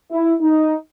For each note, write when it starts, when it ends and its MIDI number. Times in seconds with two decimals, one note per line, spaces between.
0.10 0.34 64
0.40 0.74 63